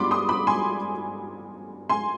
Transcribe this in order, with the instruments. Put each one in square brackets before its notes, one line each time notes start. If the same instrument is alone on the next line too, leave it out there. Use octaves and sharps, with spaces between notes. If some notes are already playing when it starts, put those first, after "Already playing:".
Already playing: [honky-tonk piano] G2 B3 D4 F4 B5 C6 D6
C6 D#6
B5 D6
G#5 C6
G#5 C6